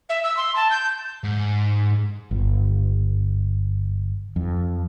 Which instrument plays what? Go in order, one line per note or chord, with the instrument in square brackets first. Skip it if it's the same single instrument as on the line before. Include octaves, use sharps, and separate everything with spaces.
[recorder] E5
E6
C6
A5
G6
[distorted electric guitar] G#2
[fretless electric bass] G1
F2